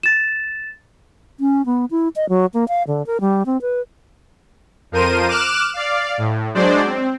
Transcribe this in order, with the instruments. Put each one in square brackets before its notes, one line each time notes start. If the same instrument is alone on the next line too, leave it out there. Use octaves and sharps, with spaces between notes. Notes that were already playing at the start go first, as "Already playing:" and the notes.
[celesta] A6 E7
[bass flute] C#4
B3
E4
D#5
F#3
A#3
F5
D3
A#4
G3
C4
B4
[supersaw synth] F2 F3 A#4 C5 D#7
D6 F6 F#6 E7
D5 F5
A2
F#3 G#3 D4 C5 D5
C4